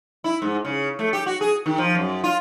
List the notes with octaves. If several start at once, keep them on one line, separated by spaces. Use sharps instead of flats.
E4
G#2
C#3
A3
G4
F#4
G#4
D#3
F3
F#2
F4